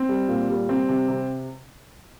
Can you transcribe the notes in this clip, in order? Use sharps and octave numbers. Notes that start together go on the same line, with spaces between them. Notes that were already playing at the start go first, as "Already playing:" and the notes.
Already playing: C4
G3
A#2
G3
G3 C4
C3
C3